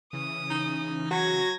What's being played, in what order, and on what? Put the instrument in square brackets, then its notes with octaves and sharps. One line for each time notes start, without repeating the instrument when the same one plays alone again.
[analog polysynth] C#3 E3 C#4 [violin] D#6
[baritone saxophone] D#4
[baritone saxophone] F#3 [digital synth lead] F#4 [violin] G#6 A#6